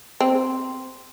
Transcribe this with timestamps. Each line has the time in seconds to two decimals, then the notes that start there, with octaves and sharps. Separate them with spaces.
0.20 C4